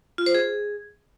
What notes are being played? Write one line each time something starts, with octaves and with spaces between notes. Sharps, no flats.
F4
C5
G#4